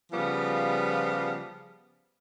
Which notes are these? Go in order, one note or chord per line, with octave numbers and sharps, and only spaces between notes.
C#3 F3 G3 B3 F4